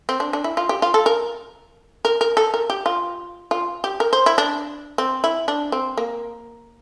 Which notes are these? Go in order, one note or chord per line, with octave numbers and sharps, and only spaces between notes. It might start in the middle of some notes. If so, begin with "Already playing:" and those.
C4
D4
D4
E4
F4
G4
F4
A4
A#4
A#4
A#4
A4
A#4
G4
F4
F4
G4
A#4
C5
E4
D4
C4
E4
D4
C4
A#3